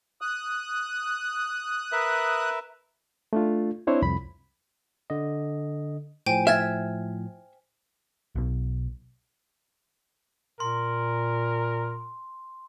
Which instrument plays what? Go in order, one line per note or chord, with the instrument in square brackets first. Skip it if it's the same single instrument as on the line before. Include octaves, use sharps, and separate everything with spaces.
[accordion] D#6 F#6
[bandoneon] A#4 B4 E5
[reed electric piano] A3 D4 F4
C4 D4 E4 C5 C#5
C2 F2 B5
[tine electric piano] D3 D#5
[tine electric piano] A2 F3 [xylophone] C5 G5 G#5
[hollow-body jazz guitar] E5 [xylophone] F6 G#6 A6
[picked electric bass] B1 B2
[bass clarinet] A#2 [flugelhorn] A#4 [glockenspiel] C6